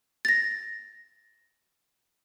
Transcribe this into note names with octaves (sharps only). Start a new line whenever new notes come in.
A6 A#6